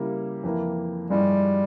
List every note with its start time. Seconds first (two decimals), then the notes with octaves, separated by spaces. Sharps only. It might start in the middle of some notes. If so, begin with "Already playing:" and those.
Already playing: C#3 G3 A#3 E4
0.43 F2 E3 A#3 E4
1.10 G2 F3 G3 G#3 E4